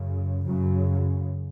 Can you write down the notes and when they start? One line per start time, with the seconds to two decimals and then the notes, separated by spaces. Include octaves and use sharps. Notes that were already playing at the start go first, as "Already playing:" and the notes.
Already playing: F#2 C#3
0.45 F#2 C#3 F#3